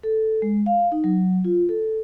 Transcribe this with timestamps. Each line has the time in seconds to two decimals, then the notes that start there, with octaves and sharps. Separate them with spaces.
0.03 A4
0.42 G#3
0.66 F5
0.92 D#4
1.04 F#3
1.44 F4
1.69 A4